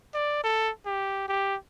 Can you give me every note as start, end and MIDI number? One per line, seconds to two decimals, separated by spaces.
0.14 0.39 74
0.44 0.70 69
0.86 1.28 67
1.28 1.55 67